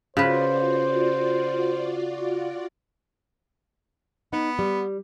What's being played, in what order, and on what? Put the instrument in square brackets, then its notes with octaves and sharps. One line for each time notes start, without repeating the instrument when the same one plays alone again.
[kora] C#3 B4 [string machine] F4 F#4 D5 [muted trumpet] C5
[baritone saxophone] B3 [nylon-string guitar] D#4
[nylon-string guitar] G3